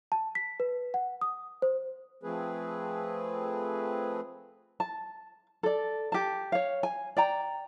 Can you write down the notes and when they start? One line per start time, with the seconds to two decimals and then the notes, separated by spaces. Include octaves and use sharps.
0.12 A5
0.35 B6
0.60 B4
0.94 F#5
1.21 D#6
1.62 C5
2.23 F3 A3 C4 G#4 B4
4.80 A5
5.63 A4 D5
6.12 G4 A5
6.52 C#5 F5
6.83 G#5
7.17 D5 G5 A#5